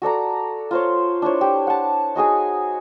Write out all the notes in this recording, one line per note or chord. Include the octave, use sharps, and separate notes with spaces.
F#4 A4 D5 A#5
F4 C5 C#5
D4 E4 C5 C#5
G4
F#5 A5
D#4 F#4 G#4 G#5